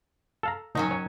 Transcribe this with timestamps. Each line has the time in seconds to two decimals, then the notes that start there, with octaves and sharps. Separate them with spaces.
0.43 A4 F5 A#5
0.75 D#3 F#3 C#4 D#4
0.91 C#5 G#5